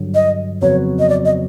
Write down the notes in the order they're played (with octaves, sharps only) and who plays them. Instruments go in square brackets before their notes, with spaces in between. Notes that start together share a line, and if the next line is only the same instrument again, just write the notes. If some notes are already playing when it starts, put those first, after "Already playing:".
Already playing: [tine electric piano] G2 D3 F#3
[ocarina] D#5
[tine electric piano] F2 C#3 F#3 B3 [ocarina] C#5
[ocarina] D#5
D5
D#5